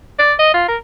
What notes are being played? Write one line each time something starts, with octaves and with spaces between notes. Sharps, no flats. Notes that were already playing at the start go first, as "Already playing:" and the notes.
D5
D#5
F4
A#4